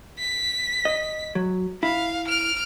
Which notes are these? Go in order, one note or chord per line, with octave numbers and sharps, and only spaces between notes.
B6
D#5
F#3
E4 F5
F6 D7